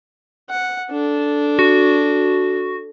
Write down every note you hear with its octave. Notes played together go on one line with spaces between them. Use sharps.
F#5
D4 A4
F#4